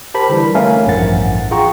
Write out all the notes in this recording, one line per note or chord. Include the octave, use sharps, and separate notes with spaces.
G4 A#4 C5 A5 B5
D3 E3 G3
A3 C#4 A#4 E5 F5 G#5
A1 E2 G2 F3 F#5 A6
F4 G#4 F#5 G5 A#5 C#6